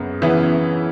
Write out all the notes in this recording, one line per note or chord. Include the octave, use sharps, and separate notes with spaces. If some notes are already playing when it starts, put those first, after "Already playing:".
Already playing: F#2 C#3 B3
C#3 E3 B3 E4